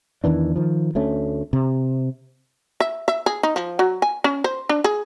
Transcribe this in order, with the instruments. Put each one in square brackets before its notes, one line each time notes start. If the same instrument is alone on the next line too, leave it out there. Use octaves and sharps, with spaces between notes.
[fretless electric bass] E2 D#3 E3 D4
D#3 F3
D2 A3 C#4
C3
[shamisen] E5
E5
G#4
D#4
F3
F#3
G#5
C#4
C5
D4
G#4